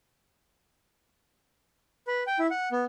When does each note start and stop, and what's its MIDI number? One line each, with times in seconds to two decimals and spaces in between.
2.07 2.23 71
2.27 2.38 79
2.39 2.47 64
2.51 2.69 78
2.72 2.85 59